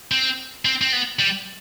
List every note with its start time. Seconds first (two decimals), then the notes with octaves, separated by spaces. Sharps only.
0.11 C4
0.65 C4
0.81 C4
0.92 B3
1.19 G3